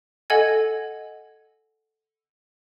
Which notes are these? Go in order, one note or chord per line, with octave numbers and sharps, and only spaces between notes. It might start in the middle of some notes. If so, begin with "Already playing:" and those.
A4 D#5 F#5 G#5 G#6